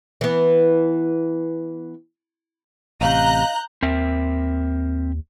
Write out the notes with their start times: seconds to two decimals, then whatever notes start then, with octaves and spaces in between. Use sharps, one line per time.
0.21 E3 B3
3.01 A1 C3 D#5 F5 A#5 F#6 G6
3.82 D#2 C4 A#4 E5